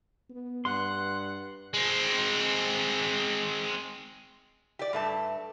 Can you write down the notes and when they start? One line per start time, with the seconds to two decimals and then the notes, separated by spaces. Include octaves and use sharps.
0.30 B3
0.65 G2 F#5 C6
1.74 G#3 C4
4.79 G4 D5
4.93 G2 A3 A5